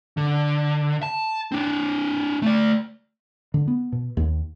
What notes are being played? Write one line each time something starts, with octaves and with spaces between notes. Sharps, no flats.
D3
A5
C4 D4
A3 D5
D3
B3
B2
D#2